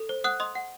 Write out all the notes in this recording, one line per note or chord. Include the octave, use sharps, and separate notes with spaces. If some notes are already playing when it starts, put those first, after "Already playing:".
Already playing: A4
C5
F#5 D#6 F#6
D#5 C6 D#6
F#5